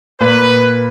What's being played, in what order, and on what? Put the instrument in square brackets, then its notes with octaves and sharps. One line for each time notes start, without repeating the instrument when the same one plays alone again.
[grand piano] A#2 [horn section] B4